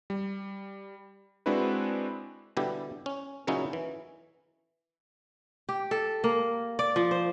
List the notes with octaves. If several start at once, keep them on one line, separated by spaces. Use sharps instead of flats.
G3
G#3 C4 D4 E4 F#4 B4
B2 D3 E3 G3 E4 G4
C#4
A#2 C#3 F#3 C#4 D#4 E4
E3
G4
A4
A#3
D5
F3
C5